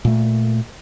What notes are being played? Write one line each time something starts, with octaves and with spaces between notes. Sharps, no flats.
A#2 A3